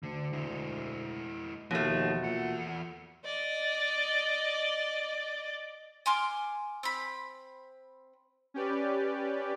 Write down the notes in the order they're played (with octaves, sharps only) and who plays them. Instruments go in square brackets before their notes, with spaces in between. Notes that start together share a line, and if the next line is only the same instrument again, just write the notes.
[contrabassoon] D2 [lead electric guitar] D3
[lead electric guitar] G#3 E4
[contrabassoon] D#2 [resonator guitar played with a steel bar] B2 A3 [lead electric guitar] F3
[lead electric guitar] E2 F#5 [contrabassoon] A#2
[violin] D5 D#5
[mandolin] G#5 C6 D6 F6
C4 B5
[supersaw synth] C#4 G4 B4 D5